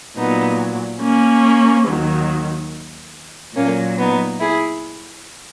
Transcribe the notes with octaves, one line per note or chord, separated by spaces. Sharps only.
A#2 F#3 B3 D#4
A#3 C#4
D#2 D#3 F#3
A#2 F#3 A#3 C#4
B3 D#4
E4 G#4